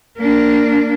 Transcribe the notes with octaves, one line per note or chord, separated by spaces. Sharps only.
A#3 D4